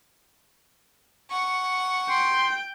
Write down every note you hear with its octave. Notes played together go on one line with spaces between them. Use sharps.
F#5 C#6
G5 C6